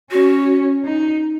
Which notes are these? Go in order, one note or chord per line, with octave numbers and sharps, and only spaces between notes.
C#4 F#4
D#4